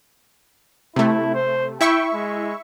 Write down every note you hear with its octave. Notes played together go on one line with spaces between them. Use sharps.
C3 A3 E4
C5
E4 E5 G5 C#6
G#3